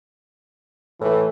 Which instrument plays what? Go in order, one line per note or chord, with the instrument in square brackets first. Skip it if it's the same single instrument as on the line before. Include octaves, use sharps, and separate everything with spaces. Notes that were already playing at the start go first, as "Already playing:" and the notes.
[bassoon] A2 [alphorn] E3